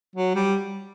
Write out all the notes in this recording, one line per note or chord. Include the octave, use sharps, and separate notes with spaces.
F#3
G3